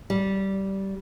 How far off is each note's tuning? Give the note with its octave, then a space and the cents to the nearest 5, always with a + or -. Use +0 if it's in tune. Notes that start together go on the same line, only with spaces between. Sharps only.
G3 -15